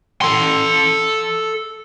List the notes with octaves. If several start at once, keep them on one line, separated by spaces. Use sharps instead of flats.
A4 C6